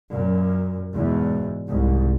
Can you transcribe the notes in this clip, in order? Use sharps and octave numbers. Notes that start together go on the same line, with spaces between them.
F#2 A#2
E2 G#2 B2
C2 G#2